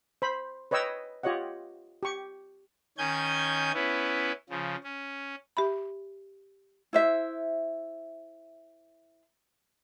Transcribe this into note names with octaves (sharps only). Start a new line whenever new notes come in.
C5 B5
B4 C#5 D#5 G5 E6
F4 G4 C#5 D#5 F#5
G4 C#6
D#3 C#4 G#5 G6 G#6
B3 C#4 E4
C#3 F3
C#4
G4 E5 B5
E4 C5 E5